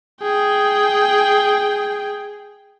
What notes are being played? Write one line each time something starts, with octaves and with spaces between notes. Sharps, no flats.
G#4 G5